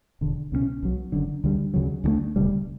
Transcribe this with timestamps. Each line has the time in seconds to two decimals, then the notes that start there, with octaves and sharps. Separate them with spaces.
0.21 E1 E2 D3
0.52 C#2 B2 F#3 C#4
0.83 B1 B2 F#3
1.12 F#1 F#2 D3
1.44 D2 D3 G3
1.74 D2 C#3 F#3
2.04 D2 D3 A3 D4
2.36 E1 D2 C#3 G3